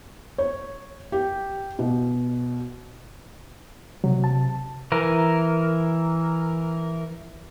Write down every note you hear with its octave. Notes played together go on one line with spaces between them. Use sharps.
C#5
G4
B2
C3 F#3
A5
E3 A#4